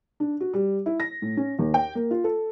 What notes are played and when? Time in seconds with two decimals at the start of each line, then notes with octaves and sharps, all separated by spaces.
0.20 D4
0.40 F#4
0.53 G3
0.86 E4
1.00 A#6
1.22 A2
1.37 C#4
1.59 D#2
1.74 G5
1.95 A#3
2.11 F4
2.24 A4